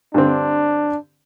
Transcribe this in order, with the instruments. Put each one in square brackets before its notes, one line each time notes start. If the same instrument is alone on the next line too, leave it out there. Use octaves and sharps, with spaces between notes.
[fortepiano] G2 D3 C4 [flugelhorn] D4